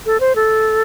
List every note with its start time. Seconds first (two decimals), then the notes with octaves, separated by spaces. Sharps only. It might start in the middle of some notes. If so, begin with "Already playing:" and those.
0.06 A4
0.20 C5
0.36 A4